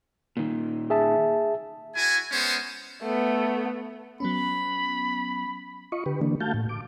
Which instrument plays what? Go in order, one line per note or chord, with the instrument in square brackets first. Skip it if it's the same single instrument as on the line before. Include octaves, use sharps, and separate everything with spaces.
[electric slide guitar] A#2 D#3
[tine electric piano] G#4 E5 A5
[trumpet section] E4 F#4 G#5
G#3 B3 C#4 C5
[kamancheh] A3 B3
[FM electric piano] F#3 B3 C#4 [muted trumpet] B5
[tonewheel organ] F4 D#5 C#6
D3 G4 B4
D3 E3 A#3 D4
A3 F#4 F5 A5 G6
A2
D6